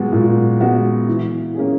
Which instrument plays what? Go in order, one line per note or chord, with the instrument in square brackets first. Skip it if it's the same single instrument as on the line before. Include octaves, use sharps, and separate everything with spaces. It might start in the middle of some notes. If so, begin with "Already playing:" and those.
Already playing: [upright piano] A#2 G#3 B3 F#4
A#2
G#3 B3 F#4
E3
A#3 C#4 G#4